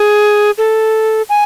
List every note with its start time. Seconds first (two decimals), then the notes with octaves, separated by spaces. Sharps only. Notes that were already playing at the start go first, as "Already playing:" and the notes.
Already playing: G#4
0.58 A4
1.29 G#5